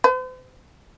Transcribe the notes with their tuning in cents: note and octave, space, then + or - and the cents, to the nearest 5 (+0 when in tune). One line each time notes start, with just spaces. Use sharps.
C5 -45